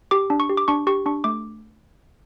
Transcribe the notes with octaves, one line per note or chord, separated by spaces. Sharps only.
G4 D6
D4
C#6
G4
D6
D4 C#6
G4 C#6
D4 C#6
A3 D6